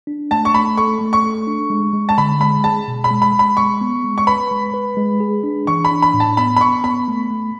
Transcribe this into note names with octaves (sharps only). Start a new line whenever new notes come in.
D4
A3 A5
C#6
A3 B5
A4 C#6
A3
C#6
A4
D4
G#3
G#3
A5
D3 B5
G#3 B5
G#4 A5
B2
B5
G#3
B5
G#3
B5
G#3 C#6
B3
G#3
C#6
B4 B5
G#3
B4
G#3
G#4
D4
E3 C#6
B5
D4
B5
A2
A5
B3 B5
B5
B3 C#6
B3 B5
A3
A3